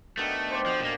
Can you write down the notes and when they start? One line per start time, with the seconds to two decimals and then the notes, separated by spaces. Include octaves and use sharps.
0.18 B2 D3 D#3 A3
0.51 C5 G5 D6
0.66 B2 F3
0.80 A#2 A#3